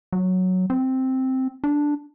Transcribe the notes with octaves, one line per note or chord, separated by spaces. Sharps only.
F#3
C4
D4